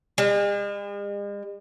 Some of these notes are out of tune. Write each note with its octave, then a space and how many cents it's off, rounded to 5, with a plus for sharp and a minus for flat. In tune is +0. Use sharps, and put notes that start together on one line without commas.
G#3 -45